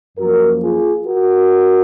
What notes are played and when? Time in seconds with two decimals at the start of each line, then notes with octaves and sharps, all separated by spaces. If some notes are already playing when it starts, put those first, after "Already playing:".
0.17 F#2 F3 A#3 F#4 A#4
0.62 F4 G#4
1.07 F#4 A#4